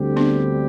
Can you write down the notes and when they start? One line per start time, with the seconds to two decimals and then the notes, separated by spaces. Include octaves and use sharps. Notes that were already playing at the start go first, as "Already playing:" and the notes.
Already playing: D2 D3 G3 C4 G4
0.17 B3 D4